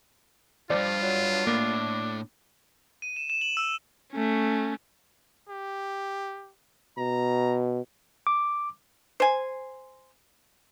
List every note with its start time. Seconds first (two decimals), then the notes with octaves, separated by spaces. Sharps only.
0.70 E2 G2 F3 F4 D5
1.03 F#3
1.47 A2 A#3 D4
3.02 D#7
3.16 E7
3.30 E7
3.41 F#7
3.57 E6
4.12 A3 C#4
5.49 G4
6.98 B2 A#5
8.27 D6
9.20 C5 G#5